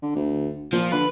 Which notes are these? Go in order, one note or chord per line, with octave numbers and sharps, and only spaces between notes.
D3
D2
A#2 F3
D3 B4